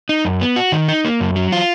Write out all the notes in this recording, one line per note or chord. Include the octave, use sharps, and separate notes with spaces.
D#4
F#2
B3
F#4
D#3
D#4
A#3
F#2
F#3
F4